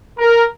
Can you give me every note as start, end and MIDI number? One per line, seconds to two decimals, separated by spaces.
0.19 0.43 70